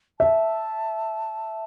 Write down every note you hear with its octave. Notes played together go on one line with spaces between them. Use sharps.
E5 A5